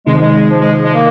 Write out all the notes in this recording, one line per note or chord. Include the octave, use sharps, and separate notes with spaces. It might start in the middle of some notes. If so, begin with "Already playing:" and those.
C3 D#3 G#3 C4 D#4
F3
G#3
F3
G#3
F3
G#3
A#3